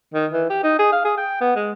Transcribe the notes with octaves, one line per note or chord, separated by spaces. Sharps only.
D#3
E3
G4
D#4
G#4
F5
G#4
G5
B3
G#3